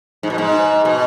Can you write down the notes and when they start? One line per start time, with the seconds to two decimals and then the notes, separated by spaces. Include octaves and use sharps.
0.23 G#2
0.30 B2
0.38 G#2
0.85 B2